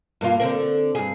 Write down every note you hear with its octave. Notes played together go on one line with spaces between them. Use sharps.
G2 A#3 F4
D3 C4 A#4
G2 G#4